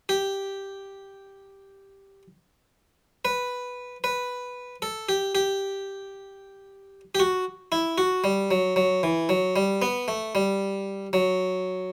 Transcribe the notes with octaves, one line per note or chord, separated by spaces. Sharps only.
G4
B4
B4
A4
G4
G4
G4
F#4
E4
F#4
G3
F#3
F#3
E3
F#3
G3
B3
A3
G3
F#3